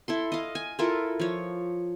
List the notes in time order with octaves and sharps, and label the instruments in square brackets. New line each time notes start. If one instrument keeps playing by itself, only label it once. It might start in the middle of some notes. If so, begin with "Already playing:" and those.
[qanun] E4 A4 C6
D#5 F5
G#5
E4 F4 A4 A#4
F3 C#5